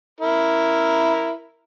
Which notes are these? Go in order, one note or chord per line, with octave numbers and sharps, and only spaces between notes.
E4 A#4